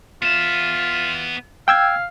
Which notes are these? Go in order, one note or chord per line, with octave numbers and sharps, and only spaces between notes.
B3 F4 E5
F5 G5 E6 G#6